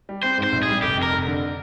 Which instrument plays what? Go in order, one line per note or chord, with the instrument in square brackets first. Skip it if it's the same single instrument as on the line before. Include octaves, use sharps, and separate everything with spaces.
[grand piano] G3
[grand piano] C4 [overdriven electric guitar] C5
[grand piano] G#2
[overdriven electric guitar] C5
[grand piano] A#1
[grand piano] G3 [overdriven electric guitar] G#4
[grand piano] F1 [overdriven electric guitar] G4
[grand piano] F2
[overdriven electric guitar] A#4
[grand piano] F1
D3